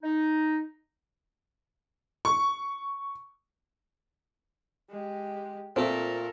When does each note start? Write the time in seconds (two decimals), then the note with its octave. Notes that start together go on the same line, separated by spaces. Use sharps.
0.03 D#4
2.25 C#6
4.90 G#3 G4
5.76 A#2 A3 C4 F4 A4 A#4